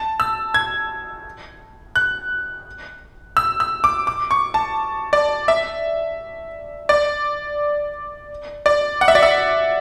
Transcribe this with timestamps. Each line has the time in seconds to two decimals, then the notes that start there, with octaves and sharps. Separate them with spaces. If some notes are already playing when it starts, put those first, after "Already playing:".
Already playing: A5
0.20 E6
0.54 G#6
1.96 F#6
3.37 E6
3.60 E6
3.84 D6
4.07 D6
4.31 C#6
4.54 A5
5.13 D5
5.48 E5
6.89 D5
8.66 D5
9.01 F#5
9.08 E5
9.15 D5
9.23 E5